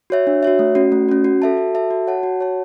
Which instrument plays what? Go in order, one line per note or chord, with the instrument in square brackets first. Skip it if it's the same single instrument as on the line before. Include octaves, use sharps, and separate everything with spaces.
[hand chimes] F#4 C#5 E5
D4
F#4 C#5 E5
A3
C#4 F#4
A3
C#4 F#4
F#4
A4 E5 A5
F#4
A4 E5 A5
F#4
C#5 F#5 A5
F#4
C#5 F#5 A5